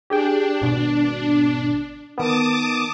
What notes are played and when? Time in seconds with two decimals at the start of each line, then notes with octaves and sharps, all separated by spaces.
0.10 D4 G4 G#4 G5
0.61 G#1 B2
2.18 D#3 B3 A5 D6 D#6